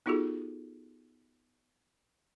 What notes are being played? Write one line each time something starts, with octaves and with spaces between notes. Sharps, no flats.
B3 D#4 F4 F#4 G#4 A4